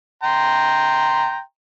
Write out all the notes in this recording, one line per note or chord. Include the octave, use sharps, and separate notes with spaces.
G5 A#5 C6